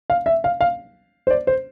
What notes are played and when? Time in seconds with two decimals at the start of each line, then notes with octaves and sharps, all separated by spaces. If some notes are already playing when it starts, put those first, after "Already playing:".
0.10 F5
0.26 E5
0.44 F5
0.61 F5
1.27 C5
1.30 D5
1.47 C5